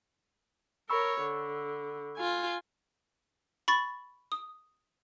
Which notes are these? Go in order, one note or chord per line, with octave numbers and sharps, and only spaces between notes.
A#4 C#5 B5 C#6 E6
D3
F4 G#5
B5 C#6 A6
D#6